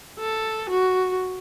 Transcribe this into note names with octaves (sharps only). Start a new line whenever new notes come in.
A4
F#4